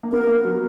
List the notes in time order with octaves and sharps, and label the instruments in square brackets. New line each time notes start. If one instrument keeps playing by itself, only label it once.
[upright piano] A#3
[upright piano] B3 [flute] A#4
[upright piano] A#3
F#3